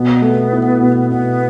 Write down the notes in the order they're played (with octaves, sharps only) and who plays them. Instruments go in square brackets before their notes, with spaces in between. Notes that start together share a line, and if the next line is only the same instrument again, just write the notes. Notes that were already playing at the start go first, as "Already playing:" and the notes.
Already playing: [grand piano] B2 [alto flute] B3
[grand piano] A3
E4
B2
[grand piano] B2 [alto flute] B3